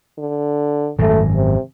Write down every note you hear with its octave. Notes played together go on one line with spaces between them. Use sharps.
D3
G#1 F#2 A3
C3